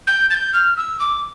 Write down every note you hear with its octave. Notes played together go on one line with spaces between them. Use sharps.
G6
A6
G6
F6
E6
D6